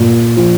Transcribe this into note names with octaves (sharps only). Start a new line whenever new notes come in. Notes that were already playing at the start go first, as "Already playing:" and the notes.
Already playing: A#2
F3